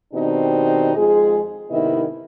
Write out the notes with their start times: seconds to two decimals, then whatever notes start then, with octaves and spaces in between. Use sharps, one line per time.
0.13 B2 D#3 C4 D4 D#4 G4
0.96 F2 G#3 F4 G#4
1.70 G#2 C3 D#3 B3 E4 D#5